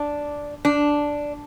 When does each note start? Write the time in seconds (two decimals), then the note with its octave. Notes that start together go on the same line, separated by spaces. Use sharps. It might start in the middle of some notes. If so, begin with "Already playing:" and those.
Already playing: D4
0.65 D4